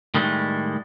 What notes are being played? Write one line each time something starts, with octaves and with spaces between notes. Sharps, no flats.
A2 D#3 G3 G#3